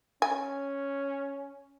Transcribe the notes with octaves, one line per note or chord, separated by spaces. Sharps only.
C#4 G#5